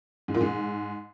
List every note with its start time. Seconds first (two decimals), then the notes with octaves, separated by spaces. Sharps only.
0.28 G#2
0.34 A#2
0.41 G#2